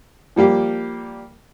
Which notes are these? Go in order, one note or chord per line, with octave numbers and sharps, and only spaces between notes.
F3 G3 A#3 G4